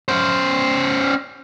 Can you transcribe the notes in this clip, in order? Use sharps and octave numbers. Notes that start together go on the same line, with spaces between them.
C#4 C5